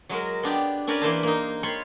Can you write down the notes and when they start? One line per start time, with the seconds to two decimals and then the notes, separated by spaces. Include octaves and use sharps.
0.09 F#3 G#3 F#4 A#4
0.43 B3 D4 G4
0.87 C#4 D4 A#4 B4 C#5 D5
1.01 E3 A#3 B4 C5 E5 A5
1.23 A#3 D#4
1.63 F4 C#5 B5 C6